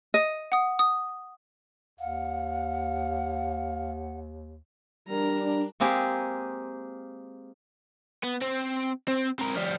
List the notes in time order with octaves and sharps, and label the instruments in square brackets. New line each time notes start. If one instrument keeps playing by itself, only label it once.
[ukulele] D#5
[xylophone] F#5 D#6
D#6
[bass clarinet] D#2 [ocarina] F5 [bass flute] F#5
[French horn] G3 [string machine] D4 [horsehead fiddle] A#4 A#5
[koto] G#3 A#3 C4 G4 G#4
[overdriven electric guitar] B3
C4
C4
C4 A#4
F3 G3